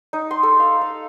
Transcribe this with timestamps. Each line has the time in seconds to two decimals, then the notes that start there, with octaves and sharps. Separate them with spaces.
0.13 D#4
0.31 C6
0.43 A4
0.60 F5
0.81 F5